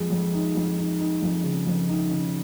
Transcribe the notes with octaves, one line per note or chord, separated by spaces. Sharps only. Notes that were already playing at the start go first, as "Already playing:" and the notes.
Already playing: F2 G#3
F2
D#4
F2
D#4
D#4
F2
C#3
F2
D#4
C#3